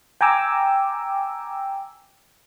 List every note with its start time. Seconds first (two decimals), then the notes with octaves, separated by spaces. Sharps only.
0.21 G5 G#5 A#5 D6 E6